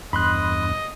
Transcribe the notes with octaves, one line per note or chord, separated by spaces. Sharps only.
E2 G2 D#5 B5 C6 F#6